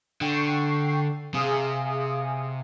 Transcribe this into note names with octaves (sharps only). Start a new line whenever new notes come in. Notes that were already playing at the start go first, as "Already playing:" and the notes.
D3 G5 C#6 C7
C3 G#4 F5 D#6